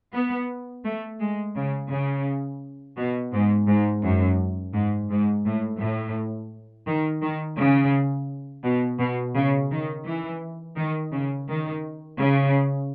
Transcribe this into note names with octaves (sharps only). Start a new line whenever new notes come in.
B3
A3
G#3
C#3
C#3
B2
G#2
G#2
F#2
G#2
G#2
A2
A2
D#3
D#3
C#3
B2
B2
C#3
D#3
E3
D#3
C#3
D#3
C#3